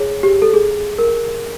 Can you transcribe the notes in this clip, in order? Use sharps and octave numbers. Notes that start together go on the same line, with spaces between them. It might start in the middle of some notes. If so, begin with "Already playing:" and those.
Already playing: G#4 C#5
G4
A4
G#4
A#4